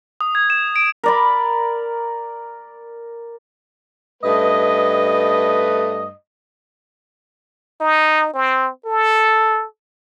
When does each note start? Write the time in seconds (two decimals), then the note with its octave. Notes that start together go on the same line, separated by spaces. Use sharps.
0.21 D#6
0.35 G#6
0.50 E7
0.76 D7
1.04 A#4 D5 B5
4.23 G2 A3 B4 D#5
7.81 D#4
8.34 C4
8.86 A4